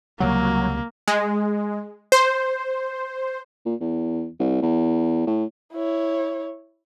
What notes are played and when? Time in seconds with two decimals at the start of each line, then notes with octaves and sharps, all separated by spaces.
0.20 C#2 C3 F#3 G3 A#3
1.08 G#3
2.12 C5
3.66 A#2
3.81 E2
4.40 C2
4.62 E2
5.27 A2
5.73 E4 C#5